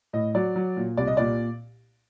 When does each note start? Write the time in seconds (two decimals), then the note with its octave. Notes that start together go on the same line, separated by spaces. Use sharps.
0.13 A2 D#5
0.35 F#3 D5
0.56 F#3
0.77 A#2
0.97 C2 D5
1.07 D#5
1.17 A#2 D5